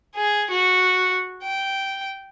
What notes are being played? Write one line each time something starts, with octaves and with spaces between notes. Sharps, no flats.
G#4
F#4
G5